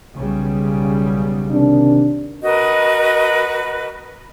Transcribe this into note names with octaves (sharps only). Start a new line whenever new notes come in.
B1 C#3 G3
C3 D#3 D4
F#4 A#4 B4 D#5